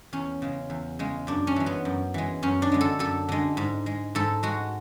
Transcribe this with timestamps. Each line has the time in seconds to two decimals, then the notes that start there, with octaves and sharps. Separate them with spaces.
0.13 E2 C#4
0.42 C#3 G#3
0.70 E2
0.99 C#3 G#3
1.27 F#2 D4
1.47 C#4
1.56 E3 G#3
1.66 B3
1.85 F#2
2.14 E3 G#3
2.43 F#2 C#4
2.62 D4
2.72 D3 G#3
2.81 A4
2.99 F#2 A4
3.29 D3 G#3
3.57 G#2
3.86 G#3
4.15 G#2 A4
4.43 G#3 F#4